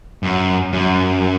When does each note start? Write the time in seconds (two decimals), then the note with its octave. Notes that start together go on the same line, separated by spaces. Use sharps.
0.23 F#2
0.73 F#2